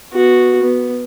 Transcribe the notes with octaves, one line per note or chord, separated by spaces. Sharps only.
B3 F#4
B3